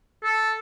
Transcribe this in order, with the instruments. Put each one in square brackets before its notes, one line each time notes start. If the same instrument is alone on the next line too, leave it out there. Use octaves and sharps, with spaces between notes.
[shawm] A4